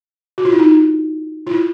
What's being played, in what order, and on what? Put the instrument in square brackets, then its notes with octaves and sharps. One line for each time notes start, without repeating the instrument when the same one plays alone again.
[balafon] F#4
F4
E4
D#4
F4
E4